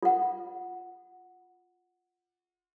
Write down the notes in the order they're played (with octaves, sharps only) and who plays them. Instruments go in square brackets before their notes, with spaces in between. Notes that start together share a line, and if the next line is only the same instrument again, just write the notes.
[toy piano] F4 F#5